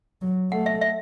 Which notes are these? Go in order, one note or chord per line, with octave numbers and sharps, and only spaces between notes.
F#3
A3 F#5
E5
E5